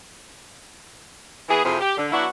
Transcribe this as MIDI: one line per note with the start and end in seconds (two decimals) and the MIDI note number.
1.49 1.63 52
1.49 1.63 59
1.49 1.63 64
1.49 1.63 68
1.65 1.80 41
1.65 1.80 48
1.65 1.80 64
1.65 1.80 65
1.65 1.80 68
1.65 1.80 72
1.81 1.95 67
1.97 2.08 50
2.12 2.26 54
2.12 2.26 59
2.12 2.26 62
2.12 2.26 64
2.12 2.26 66